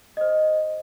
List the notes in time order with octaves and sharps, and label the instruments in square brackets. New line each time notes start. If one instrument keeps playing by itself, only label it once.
[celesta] C5 D#5